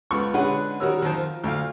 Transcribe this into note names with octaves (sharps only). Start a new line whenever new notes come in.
C#2 B3 F4 C#6
D3 G#3 C#4 B4 F#5
D#3 G3 F#4 A#4 C#5 E6
D#3 F3 C5
F4
D2 F5